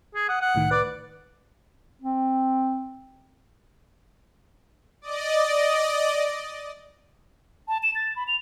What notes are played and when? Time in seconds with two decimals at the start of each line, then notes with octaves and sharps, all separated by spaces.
0.15 G#4
0.29 F#5 D#6
0.41 F#5
0.55 C2 A2 D#3
0.71 B4 D5
2.02 C4
5.02 D5 D#5
7.68 A5
7.83 E7
7.95 A6
8.16 B5
8.28 F7